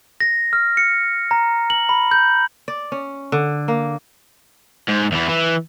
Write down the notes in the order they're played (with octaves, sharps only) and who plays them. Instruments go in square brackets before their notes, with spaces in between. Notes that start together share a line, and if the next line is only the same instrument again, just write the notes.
[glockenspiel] A#6
F6
C#7
A#5
F#7
B5
G6
[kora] D5
C#4
D3
A#3
[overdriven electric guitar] G#2
E2 E3
E3